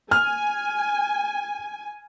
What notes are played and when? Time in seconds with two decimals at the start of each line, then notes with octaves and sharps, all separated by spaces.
0.11 G#5 F6